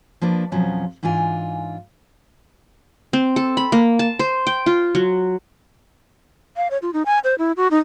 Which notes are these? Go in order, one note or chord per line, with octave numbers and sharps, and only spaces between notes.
F3 A#3 D4 B4
F2 B2 F3 F#3 C#4
G#2 E3 D4 F4 G#5
C4
A4
B5
A#3
A5
C5
G5
F4
F#3
F5
C#5
F4
D#4
G#5
C5
E4
F#4
D#4